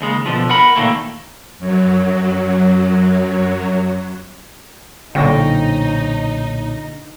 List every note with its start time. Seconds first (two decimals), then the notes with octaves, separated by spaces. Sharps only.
0.01 D#2 C#3 G#3
0.26 B2 D3 F3
0.49 A#4 F#5 B5
0.76 A#2 D#3 E3 A3 A#3
1.59 F#2 F#3
5.15 B1 A#2 D3 C#4 D#4 C5 G5 A#6